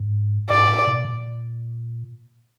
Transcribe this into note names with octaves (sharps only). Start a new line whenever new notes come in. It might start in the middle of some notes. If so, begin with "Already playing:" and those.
Already playing: G#2
G#2 D5
A2
B2
A#2